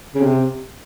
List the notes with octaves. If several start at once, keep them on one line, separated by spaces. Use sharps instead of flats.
C#3
C3